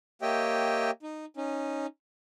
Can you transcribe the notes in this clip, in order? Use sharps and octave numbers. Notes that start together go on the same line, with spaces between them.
A#3 G4 C#5 D#5 E5 G5
D#4
C#4 D#4